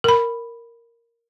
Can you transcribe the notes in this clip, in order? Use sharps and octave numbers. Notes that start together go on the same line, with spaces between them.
A#4 B5